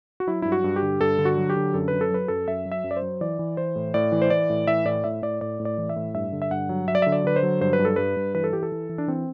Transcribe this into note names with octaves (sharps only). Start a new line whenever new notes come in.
F#4
F#3 E4
G2 E4
F#4
G2
G4
D3
G2 A4
D3
F#4
F#3
G4
D3
F#2 A4
F#2 B4
A4
F#3 B4
F#2 A4
F#2 E5
F#3
E5
F#2
D5
C5
F#3
E3 D5
E3
E3 C5
A2
A2 D5
E3
C5
E3 D5
A2
E3 E5
A2 D5
A2 E5
A2 D5
A2 D5
A2
D5
E3
E5
A2
G2 E5
D3
E5
G2 F#5
F#3
F#3 E5
D5
D3 E5
D5
D3 B4
C5
F#3
G2 C5
B4
G2
A4
G2 B4
G2
E3 B4
A4
E3 G4
A4
E3
E3
D4
E3 C4